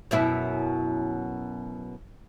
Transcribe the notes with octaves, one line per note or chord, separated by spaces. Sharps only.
F#2 B2 E4